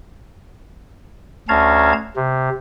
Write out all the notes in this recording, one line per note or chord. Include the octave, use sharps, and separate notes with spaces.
D2 C#4 F5 A5 A#5 G#6
C3